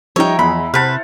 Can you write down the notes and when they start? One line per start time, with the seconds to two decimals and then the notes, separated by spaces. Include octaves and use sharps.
0.16 F3 G3 D#4 C#5 E5 G5 A#5
0.39 E2 G#3 E4 B5 C6
0.74 C3 B4 C5 F#5 A5 B5 F6